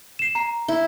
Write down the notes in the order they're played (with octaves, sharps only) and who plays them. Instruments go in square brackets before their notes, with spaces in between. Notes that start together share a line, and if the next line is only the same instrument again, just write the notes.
[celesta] C7 E7
A#5
[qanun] E4